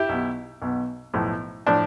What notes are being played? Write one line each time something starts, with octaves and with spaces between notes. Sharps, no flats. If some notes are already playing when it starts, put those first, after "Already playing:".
Already playing: E4 G4
B1 B2
B1 B2
B1 A2 F3
A2 F3 D4